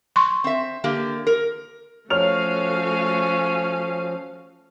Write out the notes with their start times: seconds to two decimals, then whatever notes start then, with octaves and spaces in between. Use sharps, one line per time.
0.16 C6 C#6
0.44 C4 E5
0.84 D3 A#3 G4
1.27 A#4
2.10 F3 A3 C#4 F#4 C#5 F5 F6 F7